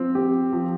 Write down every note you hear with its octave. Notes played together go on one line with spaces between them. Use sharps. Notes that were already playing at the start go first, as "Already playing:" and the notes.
Already playing: F3 C4
G4
F3